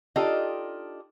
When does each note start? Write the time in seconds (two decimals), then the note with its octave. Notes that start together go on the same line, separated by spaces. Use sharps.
0.16 D4 D#4 F4 G4 A4 D#5